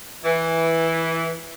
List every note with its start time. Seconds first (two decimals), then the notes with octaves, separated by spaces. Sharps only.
0.23 E3